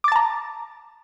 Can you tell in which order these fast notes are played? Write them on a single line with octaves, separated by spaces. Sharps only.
D6 A6 A5 A#5